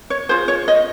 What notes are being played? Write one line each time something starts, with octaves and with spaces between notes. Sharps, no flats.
C#5
F4 G#4 C5
C#5
D#5